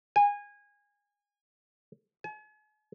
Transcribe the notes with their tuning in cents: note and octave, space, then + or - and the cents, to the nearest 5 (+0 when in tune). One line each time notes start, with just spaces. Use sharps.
G#5 -20
G#5 +45